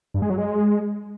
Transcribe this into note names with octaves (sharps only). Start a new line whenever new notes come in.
G2
G#3
F#3
G#3